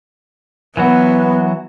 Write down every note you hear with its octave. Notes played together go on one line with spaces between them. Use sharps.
E3 F#3 B3 F#4 B4